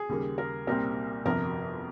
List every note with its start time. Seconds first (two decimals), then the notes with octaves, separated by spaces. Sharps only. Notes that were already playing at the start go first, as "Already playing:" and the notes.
Already playing: G#4
0.09 D#2 C#3 G3 A#3
0.38 A#4
0.67 C2 A#2 G3 C4 A#4
1.25 G1 F2 C3 F3 A#4